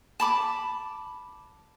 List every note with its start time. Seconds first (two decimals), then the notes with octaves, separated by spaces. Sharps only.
0.20 A5 B5 D6